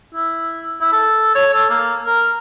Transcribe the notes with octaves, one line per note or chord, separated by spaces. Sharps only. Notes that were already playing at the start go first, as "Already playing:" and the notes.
E4
E4
A4
C#5
A4
A#3
A#4